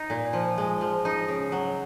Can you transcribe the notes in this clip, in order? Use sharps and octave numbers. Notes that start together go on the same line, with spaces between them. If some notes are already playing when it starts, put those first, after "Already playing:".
Already playing: D#4
A#2
F3
G#3
F3
D#4
C#3
F#3